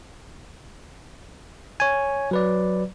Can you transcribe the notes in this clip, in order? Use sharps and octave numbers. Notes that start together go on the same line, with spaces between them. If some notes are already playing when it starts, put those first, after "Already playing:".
C#5 G#5
F#3 B4 D5